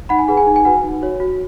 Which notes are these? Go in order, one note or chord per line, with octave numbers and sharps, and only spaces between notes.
D#4 F#5 B5
G#5
G#4 B4 F#5
G#5
D#4
G#5
F#4 B4 F#5
D#4
F#4 C#5
F#4